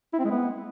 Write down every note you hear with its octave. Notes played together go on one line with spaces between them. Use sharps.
E4
C4
G#3
B3